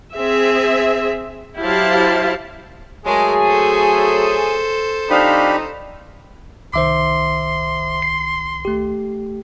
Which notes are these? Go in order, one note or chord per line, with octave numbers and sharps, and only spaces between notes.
C4 G#4 E5
F#3 E4 G4 C5 F5 A5
F#3 G#3 A3 G#4 A#4 G#5
A4 C5
F3 C4 D4 D#4 G4 F5 B5
C2 D#3 C5 E5 C6 D6
C7
A3 G4